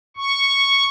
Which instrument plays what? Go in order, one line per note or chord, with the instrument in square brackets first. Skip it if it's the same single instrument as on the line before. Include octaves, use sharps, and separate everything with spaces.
[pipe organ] C#6